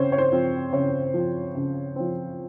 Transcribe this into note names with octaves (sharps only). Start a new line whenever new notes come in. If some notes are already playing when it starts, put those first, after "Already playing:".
Already playing: C#3 C4 C5 C#5
C#5
C5
F3 C4
C#3 C#5
F3 C4
C#3
F3 C4